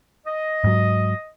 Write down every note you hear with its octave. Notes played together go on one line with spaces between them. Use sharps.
D#5
G#2 F#3